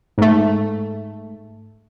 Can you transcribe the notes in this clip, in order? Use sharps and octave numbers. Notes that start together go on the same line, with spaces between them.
G#2 A3